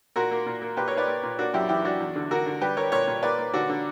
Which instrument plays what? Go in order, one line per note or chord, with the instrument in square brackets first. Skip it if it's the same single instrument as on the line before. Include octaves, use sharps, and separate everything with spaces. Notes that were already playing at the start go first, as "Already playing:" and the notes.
[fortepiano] A#2 F#4 A#4
A#3
A#2
A#3
A#2 G4 B4
A#4 C#5
A#3 B4 D5
A#3
A#2
A#3 D4 F#4
F#2 E4 G4
E3 E4 G4
F#2 D4 F#4
E2
D3
D3 F#4 A#4
D3
G3 G4 B4
G3 A#4 C#5
A#2 A#4 C#5
A#2
A#3 B4 D5
A#3
D3 D4 F#4
D3